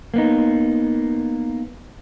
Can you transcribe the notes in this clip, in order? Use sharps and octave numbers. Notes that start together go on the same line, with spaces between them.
A#3 B3 D#4